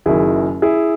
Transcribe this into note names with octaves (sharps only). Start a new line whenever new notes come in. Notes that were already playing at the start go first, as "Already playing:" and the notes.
F#1 F#2 D#3 E4 G#4
E4 G#4